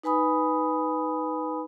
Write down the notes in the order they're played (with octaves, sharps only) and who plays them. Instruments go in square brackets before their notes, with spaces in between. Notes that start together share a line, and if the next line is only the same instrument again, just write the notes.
[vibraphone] D#4 B4 G#5 B5 D#6